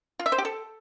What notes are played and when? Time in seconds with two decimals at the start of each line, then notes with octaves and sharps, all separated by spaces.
0.19 F4
0.26 E5
0.32 C5
0.38 G4
0.45 A4